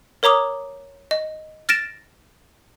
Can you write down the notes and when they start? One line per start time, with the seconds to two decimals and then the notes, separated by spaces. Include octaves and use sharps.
0.23 A#4 C#5 A#5 D6 D#6
1.11 D#5
1.69 F6 A6 A#6 D7 E7